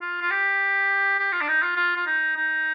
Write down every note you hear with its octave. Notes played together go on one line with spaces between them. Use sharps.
F4
F4
G4
G4
F4
D4
D#4
F4
F4
F4
D#4
D#4